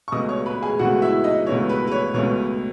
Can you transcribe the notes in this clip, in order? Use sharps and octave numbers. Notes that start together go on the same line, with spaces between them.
C#6
C#2 B2 A3 D#5 D#6
C#5 C#6
B4 B5
G#4 G#5
C#2 B2 A3 F#4 F#5
E4 E5
D#4 D#5
C#2 B2 A3 C#5
B4
B4
C#5
C#2 B2 A3 C#5